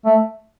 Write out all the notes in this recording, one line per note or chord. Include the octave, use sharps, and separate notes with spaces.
A3